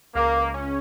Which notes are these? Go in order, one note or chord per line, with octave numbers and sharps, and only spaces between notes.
C#2 A#3
C#2
C#4